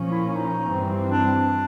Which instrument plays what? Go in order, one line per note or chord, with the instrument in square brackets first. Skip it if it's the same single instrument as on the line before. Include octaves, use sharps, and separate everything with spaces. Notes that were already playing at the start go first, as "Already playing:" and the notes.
Already playing: [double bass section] A#2 F3 A#3 C#4
[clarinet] E4
D#4
[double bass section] G2 E3 G3 C4
[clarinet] D4